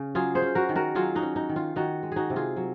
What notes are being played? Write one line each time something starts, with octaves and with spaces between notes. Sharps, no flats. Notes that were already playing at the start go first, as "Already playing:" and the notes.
Already playing: C#3 C#4
F#3 F4 G#4
G#4 C5
C#4
F#4 A#4
D#3
F#4 A#4
F#3 F4 G#4
D#4 F#4
C#4
D#4
D#3
F4
D#3 D#4 F#4
G#3
D#4 F#4 G#4
C3
F4 G#4
F#3